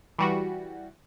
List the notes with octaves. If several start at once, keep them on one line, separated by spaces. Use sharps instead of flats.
E3 G3 F#4